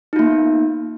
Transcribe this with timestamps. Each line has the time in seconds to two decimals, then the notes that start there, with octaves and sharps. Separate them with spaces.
0.13 D#4
0.16 F4
0.19 A#3
0.22 B3